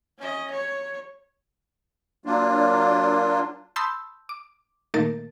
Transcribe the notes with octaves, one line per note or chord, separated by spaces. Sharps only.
C#4 D#5
C#5
F#3 A#3 D4 F4
A5 B5 C6 D#6 E6 G6
D6
A#2 D#3 A3 A#3 A#4 A6